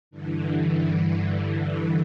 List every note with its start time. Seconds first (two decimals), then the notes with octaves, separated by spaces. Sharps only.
0.11 G2 D3 E3